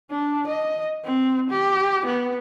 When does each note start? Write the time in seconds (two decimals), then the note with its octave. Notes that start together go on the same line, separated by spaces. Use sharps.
0.11 D4
0.48 D#5
1.05 C4
1.50 G4
2.06 B3